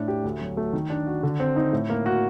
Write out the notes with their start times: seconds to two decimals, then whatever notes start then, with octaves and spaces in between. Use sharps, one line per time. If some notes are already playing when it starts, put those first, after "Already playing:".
Already playing: A2 D4
0.08 G4
0.24 D2
0.41 F#3
0.57 A3
0.73 D#3
0.90 D4
1.07 F#4
1.23 D3
1.40 C4
1.56 D#4
1.73 A2
1.90 A#3
2.06 F#4